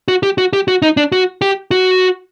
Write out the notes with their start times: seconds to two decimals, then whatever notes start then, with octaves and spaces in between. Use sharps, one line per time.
0.08 F#4
0.23 G4
0.38 F#4
0.53 G4
0.68 F#4
0.82 D#4
0.97 D4
1.12 F#4
1.42 G4
1.71 F#4